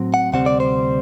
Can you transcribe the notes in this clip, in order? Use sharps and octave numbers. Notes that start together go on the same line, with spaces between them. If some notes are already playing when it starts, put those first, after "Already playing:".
Already playing: A2 F#3 C4
F#5
D2 C3 G3 C4 F#5
D5
C5